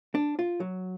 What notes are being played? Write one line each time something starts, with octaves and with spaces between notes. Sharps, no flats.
D4
F4
F#3